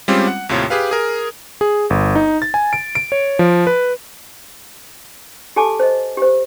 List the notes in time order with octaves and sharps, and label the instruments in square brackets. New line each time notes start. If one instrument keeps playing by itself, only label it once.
[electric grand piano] G3 G#3 C4 C#4 F4 G4
F#5
D#2 A2 C3 F4 C#5
G4 G#4 B4 F5
G#4 A#4
G#4
G1
D#4
A6
G#5
D7
D7
C#5
F3
B4
[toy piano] G4 A4 G#5 A5 D6
C5 D#5
G4 C5